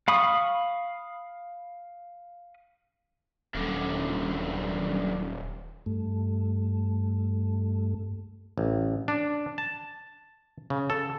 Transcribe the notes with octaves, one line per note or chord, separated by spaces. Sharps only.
F5 B5 C#6 D#6
D#1 F#2 D3
G2 A3
A1
D4
A5
C#3
A4